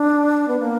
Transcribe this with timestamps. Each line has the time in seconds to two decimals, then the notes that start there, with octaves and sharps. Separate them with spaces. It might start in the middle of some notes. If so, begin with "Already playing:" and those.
Already playing: D4
0.48 B3
0.59 A#3